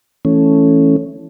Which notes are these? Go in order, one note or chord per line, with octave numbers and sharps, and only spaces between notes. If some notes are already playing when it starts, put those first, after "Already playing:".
E3 A3 C#4